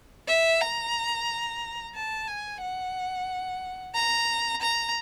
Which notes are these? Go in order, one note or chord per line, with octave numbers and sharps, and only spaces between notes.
E5
A#5
A5
G#5
F#5
A#5
A#5